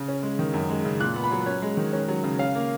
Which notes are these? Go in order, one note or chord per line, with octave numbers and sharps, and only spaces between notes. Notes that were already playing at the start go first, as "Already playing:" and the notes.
Already playing: C#3
C#4
G#3
D#3
F#2
G#3
C#3
A#2 F#6
B3
B5
F#3
C#4 C#5
G#3
D#3
C#4
F#3
C#3
C#4 F5
A#3